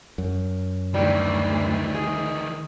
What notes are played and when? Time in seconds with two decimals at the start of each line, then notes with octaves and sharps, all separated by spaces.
0.18 F#2
0.94 D2 D#3 E3 G3
1.94 G#4